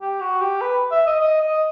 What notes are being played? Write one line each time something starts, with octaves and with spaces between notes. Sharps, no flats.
G4
F#4
G4
B4
E5
D#5
D#5
D#5